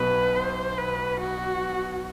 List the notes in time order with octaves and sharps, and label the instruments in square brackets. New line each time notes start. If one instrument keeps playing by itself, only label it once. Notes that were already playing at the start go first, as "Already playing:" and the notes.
Already playing: [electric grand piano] B1 B2 [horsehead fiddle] B4
[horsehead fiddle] C5
B4
F#4